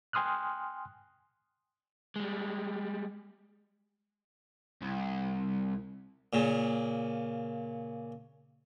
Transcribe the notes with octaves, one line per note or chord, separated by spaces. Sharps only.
G5 G#5 C6 D#6 F6 F#6
G3 G#3
C2
A#2 C#3